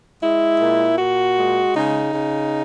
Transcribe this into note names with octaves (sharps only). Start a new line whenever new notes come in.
G#3 E4
A#2
A#2 F#4
G#3
C#3 D#4
C#3